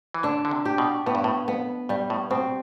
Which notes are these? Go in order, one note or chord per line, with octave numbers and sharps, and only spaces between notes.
E3
D3 D4
D3
C3
G4
B2
A2 B3
G2
A2
F2 B3
G2 G3
A2
B2 C4